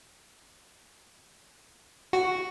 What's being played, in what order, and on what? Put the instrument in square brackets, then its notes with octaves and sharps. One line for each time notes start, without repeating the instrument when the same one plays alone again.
[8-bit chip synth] F#4